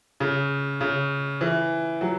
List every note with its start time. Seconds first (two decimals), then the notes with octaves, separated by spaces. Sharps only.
0.20 C#3
0.81 C#3
1.41 E3
2.01 F#3